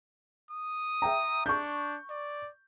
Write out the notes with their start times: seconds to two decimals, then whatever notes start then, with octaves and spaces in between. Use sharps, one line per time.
0.51 D#6
1.02 E5 G5 A#5
1.46 D4 C#6 G6
2.10 D5